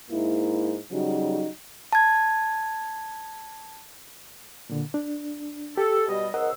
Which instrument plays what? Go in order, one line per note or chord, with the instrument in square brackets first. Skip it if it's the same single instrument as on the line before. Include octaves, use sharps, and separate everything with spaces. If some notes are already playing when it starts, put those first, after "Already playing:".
[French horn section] G#2 A#3 E4
C#3 F#3 G3 D#4 F#4
[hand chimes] A5 G#6
[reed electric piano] A#2 D3
D4
[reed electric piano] G4 [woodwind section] A4
[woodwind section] B2 G3 D#5
[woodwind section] C#2 C5 E6 [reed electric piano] A#4 D#5 F#5